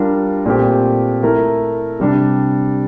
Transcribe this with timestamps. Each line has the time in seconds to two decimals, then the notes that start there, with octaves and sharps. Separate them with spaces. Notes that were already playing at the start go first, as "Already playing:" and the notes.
Already playing: G3 D4 F4 A#4
0.46 A#2 A3 C4 G4
1.23 A3 E4 A#4
2.00 C3 G3 D4